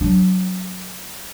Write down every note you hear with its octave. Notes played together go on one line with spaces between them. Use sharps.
F#3 D4